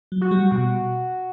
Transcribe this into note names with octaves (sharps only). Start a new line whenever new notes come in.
F#3
F#4
G3
B2 F#4